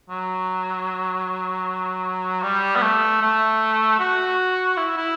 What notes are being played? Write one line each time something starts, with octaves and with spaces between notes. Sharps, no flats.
F#3
G3
B3
A3
A3
F#4
E4
E4